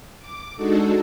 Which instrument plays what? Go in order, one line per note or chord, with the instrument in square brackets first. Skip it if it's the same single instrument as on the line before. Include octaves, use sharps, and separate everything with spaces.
[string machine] D6
G#3 D4 D#4 F#4 A4